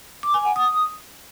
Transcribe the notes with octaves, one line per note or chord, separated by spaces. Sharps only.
D6
G#5
F#5
D#6